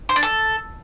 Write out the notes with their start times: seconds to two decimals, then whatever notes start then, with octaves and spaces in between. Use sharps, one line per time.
0.09 C5
0.16 D4
0.23 A4